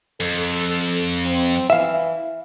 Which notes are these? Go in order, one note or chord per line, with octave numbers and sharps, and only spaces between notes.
F2 A4
C4
E3 E5 F5